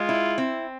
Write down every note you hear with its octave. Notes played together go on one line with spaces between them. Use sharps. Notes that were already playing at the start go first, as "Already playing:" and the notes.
Already playing: G#3 F4
E4
C4